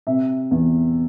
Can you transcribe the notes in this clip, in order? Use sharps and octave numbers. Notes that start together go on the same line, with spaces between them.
C3 E5
E2